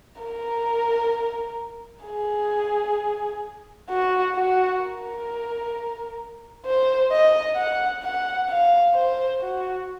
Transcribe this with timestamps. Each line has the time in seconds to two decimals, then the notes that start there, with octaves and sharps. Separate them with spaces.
0.21 A#4
2.05 G#4
3.90 F#4
4.35 F#4
4.82 A#4
6.66 C5
7.12 D#5
7.57 F#5
8.03 F#5
8.49 F5
8.95 C5
9.41 F#4